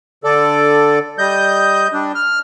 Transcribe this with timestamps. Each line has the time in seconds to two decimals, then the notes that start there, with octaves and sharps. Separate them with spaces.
0.24 D3 A4 D5
1.18 G3 D#5 G6
1.93 G3 D4
2.15 F6